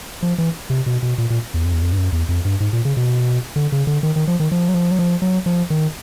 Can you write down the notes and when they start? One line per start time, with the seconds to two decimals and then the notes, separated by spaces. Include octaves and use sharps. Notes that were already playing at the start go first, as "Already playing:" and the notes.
0.23 F3
0.38 E3
0.70 C3
0.86 B2
1.03 B2
1.18 A#2
1.30 A#2
1.54 E2
1.65 F2
1.73 E2
1.82 F2
1.93 G2
1.98 F#2
2.12 E2
2.29 F2
2.45 G2
2.60 G#2
2.73 A#2
2.85 C#3
2.97 B2
3.56 D3
3.72 C#3
3.87 D3
4.03 D#3
4.16 D#3
4.28 F3
4.40 D#3
4.52 F3
4.69 F#3
4.74 F3
4.91 F#3
4.99 F3
5.22 F#3
5.46 F3
5.70 D#3